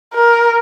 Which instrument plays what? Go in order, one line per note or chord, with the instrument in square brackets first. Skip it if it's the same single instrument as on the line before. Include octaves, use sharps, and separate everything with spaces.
[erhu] A#4